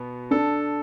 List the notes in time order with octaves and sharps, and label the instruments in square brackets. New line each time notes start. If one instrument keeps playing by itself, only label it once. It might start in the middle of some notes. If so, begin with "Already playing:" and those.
Already playing: [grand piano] B2 B3
[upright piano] D4 [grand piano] A4